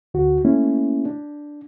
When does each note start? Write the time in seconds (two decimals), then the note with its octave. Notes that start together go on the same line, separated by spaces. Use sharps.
0.14 D2 F#4
0.45 A3 A#3 C#4 E4
1.06 D4